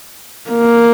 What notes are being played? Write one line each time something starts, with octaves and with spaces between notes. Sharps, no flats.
A#3